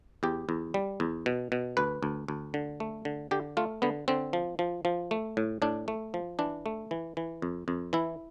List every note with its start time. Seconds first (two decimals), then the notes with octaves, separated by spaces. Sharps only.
0.23 E2 G4
0.49 E2
0.74 G3
1.00 E2
1.26 B2
1.52 B2
1.77 D2 B4
2.03 D2
2.28 D2
2.54 D3
2.80 A3
3.05 D3
3.31 D3 G4
3.57 A3 F4
3.82 D3 B3
4.08 D3 C4
4.33 F3
4.59 F3
4.85 F3
5.11 A3
5.37 A2
5.62 A2 D4
5.88 A3
6.14 F3
6.39 E3 D4
6.66 A3
6.91 E3
7.17 E3
7.42 F2
7.68 F2
7.93 E3 E4